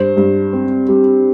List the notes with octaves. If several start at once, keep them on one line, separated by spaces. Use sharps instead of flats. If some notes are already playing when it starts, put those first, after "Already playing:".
Already playing: G2 C5
G2
C4
G3